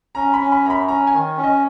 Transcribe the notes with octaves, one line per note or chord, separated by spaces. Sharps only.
C#4 A#5
B5
C#4
B5
F#2 A#5
B5
C#4 A#5
G#5
D#3
C#4
D#5